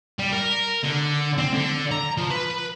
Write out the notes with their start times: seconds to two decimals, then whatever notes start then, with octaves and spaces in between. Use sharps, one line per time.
0.19 G3
0.33 A#4
0.84 D3
1.38 C4
1.54 D3
1.91 A#5
2.17 F3
2.30 B4